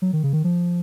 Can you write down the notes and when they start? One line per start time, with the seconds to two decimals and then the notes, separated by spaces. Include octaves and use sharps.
0.02 F#3
0.13 D#3
0.23 C#3
0.33 D#3
0.44 F3